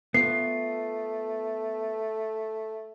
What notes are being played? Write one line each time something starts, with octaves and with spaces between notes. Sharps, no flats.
A3 B3 F4 C7